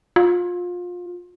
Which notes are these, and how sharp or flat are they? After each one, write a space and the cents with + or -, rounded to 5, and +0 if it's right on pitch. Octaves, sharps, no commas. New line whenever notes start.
F4 +25